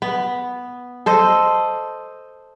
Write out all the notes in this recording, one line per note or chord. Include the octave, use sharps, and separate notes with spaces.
B3
A4 C5 D#5